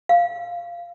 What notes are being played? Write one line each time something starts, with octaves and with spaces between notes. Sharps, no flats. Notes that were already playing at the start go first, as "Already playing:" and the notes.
F5